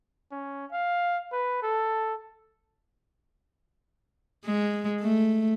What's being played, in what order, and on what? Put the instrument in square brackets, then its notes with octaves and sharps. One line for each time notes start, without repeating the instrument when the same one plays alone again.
[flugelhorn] C#4
F5
B4
A4
[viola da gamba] G#3
A3